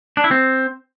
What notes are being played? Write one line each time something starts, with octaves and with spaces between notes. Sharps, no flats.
D4
E4
C4